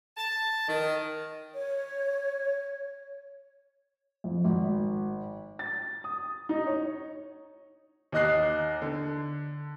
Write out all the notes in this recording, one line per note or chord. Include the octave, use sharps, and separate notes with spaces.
A5
D#3
C#5
F2
G#1
A6
D#6
D#4
C#5
D#2 D#4 D#5 F#6 C7
D3